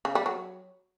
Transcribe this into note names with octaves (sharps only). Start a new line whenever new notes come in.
C#3
G3
F#3